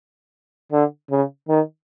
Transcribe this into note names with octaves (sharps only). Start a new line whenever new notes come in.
D3
C#3
D#3